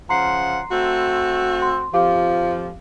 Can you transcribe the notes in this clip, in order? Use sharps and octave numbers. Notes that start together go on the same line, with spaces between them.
C#3 F3 F#5 A#5 C6 C7
A3 C4 F#4
C6
F2 F3 G4 F5 D6